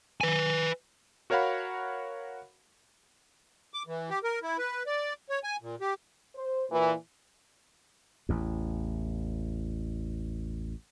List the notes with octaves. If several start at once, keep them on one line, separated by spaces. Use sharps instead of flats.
B4 G#5
F#4 A#4 C#5 F5 F#5 B5
D6
E3
G4
A#4
E4
B4
D5
C#5
G#5
A#2
G4
C5
A#2 E3
A1 E2